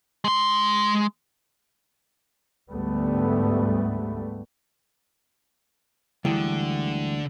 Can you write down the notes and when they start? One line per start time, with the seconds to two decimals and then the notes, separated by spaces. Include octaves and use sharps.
0.24 G#3 C6
2.72 D2 G#2 G3 A3 B3
6.25 D2 D3 E3 G3 G#3 E4 G5